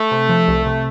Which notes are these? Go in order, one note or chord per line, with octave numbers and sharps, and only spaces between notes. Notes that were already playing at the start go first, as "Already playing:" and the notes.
Already playing: A3
C3
F3
C2
C3